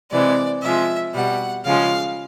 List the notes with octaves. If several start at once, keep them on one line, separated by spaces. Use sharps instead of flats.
C3 E3 G#3 D5
C3 F3 G#3 E5
B2 G3 F#5
C#3 F3 G#3 F5